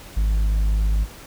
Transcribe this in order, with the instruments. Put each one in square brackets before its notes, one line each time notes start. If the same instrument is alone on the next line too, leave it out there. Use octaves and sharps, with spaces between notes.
[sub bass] G#1